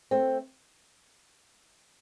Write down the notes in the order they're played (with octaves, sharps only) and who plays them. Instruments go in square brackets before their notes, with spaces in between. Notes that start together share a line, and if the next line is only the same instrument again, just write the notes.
[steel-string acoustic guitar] A3 C4